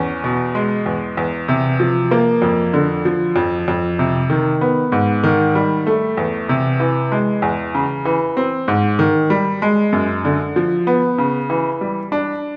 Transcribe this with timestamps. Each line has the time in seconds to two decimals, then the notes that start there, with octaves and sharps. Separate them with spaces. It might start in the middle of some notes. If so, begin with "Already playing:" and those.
Already playing: E2 C#4
0.24 B2
0.55 G#3
0.86 E2
1.17 E2
1.48 C3
1.80 F3
2.11 A#3
2.42 F2
2.74 D3
3.05 F3
3.36 F2
3.68 F2
3.99 C3
4.30 D#3
4.61 B3
4.92 G#2
5.24 D#3
5.55 G3
5.87 A3
6.17 E2
6.49 C3
6.80 E3
7.12 G#3
7.42 E2
7.75 C#3
8.05 E3
8.37 C4
8.68 G#2
8.99 D#3
9.30 G3
9.62 G#3
9.92 F#2
10.25 D3
10.56 F3
10.87 B3
11.18 C#3
11.50 E3
11.81 G3
12.12 D4